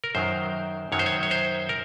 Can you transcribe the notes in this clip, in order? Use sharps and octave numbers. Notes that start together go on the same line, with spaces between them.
A#4
F#2 D#3 F#3 C5
F#2 D#3 F#3 C#5
C5
C#5
C#5
C5
A#4